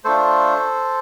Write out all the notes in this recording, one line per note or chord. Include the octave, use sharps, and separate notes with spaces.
A3 D4 F4 A4 C5